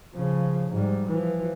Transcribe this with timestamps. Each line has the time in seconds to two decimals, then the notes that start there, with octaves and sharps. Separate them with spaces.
0.14 C#3 F3
0.70 G#2 G3
1.08 E3 F3